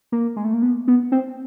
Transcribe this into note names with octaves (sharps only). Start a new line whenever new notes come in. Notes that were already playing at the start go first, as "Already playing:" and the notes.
A#3
G#3
A3
A#3
B3
B3
C4